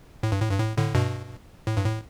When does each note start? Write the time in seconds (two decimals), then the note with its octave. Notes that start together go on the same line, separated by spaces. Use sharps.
0.23 A2
0.32 G2
0.41 A2
0.51 G2
0.59 A2
0.77 A2 D3
0.95 G2 B2
1.67 A2
1.77 G2
1.85 A2